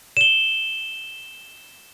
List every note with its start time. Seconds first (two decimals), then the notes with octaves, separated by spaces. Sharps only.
0.17 E7 G7